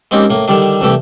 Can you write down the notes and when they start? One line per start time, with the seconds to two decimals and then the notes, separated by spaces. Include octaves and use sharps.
0.11 G#3 A#3 C4 C#4 D#4 G4
0.30 A2 A#3
0.48 D3 D#3 G3 D4
0.81 C2 E3 A3 G4